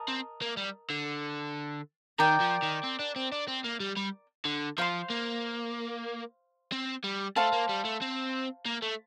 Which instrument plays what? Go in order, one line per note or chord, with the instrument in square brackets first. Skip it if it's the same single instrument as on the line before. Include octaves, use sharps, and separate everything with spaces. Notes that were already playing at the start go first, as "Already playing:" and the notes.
Already playing: [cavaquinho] A#4 D#5 A5
[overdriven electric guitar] C4
A#3
G3
D3
[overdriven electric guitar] D#3 [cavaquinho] A#4 D5 G5
[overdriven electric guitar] F3
D#3
C4
D4
C4
D4
C4
A#3
G3
G3
D3
[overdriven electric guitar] F3 [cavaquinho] C5 F5 C6
[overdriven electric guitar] A#3
C4
G3
[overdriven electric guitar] A3 [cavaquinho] C5 F5 A5
[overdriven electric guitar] A#3
G3
A3
C4
A#3
A3